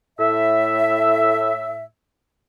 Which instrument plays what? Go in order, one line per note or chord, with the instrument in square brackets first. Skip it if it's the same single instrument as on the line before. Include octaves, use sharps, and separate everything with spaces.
[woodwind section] A2 E5